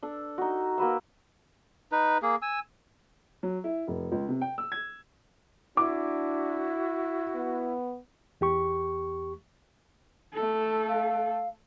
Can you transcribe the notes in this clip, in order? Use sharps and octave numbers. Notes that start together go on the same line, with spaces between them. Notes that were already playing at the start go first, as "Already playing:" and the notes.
D4 A4
D#4 F#4
A#3 F#4 B4 E6
D#4 B4
A#3 G#4
G#5 E6
F#3
E4
F1
C#2
C3
G5
E6
G#6
D4 E4 F#4 D6
B3
E2 G4 C#6
A3 A4
F5